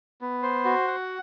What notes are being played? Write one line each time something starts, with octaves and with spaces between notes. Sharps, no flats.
B3
C5
F#4
F#5